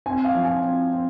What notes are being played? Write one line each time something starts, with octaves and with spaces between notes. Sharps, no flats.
C4 G#5
F5
F3
G#5
C4
C4